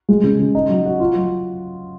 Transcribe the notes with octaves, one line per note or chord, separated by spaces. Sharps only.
G#3
C#3
C#3
D#4
F#3
F#4
F4
F#3